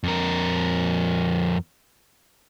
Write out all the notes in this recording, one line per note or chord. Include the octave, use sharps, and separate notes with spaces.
F2 A#4